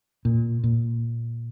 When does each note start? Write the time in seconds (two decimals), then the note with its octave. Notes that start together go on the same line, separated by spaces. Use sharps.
0.25 A#2
0.64 A#2